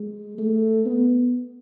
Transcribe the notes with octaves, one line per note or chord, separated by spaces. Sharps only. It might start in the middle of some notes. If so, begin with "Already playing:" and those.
Already playing: G#3
A3
B3